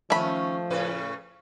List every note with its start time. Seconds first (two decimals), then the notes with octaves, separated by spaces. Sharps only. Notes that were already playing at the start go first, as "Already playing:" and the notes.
0.10 D#3 F3 A3 C#4 B5
0.70 A2 C#3 B4